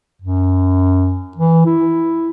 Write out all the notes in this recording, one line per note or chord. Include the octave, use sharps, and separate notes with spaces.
F#2
E3
E4